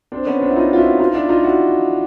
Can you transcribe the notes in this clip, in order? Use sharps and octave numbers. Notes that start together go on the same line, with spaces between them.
C4 D4
B3 C#4
C4 D4
E4
D#4 F4
F4
E4 F#4
D#4 F4
D4 E4
D#4 F4
E4 F#4